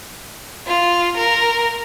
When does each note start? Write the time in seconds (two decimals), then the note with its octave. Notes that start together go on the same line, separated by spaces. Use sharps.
0.67 F4
1.17 A#4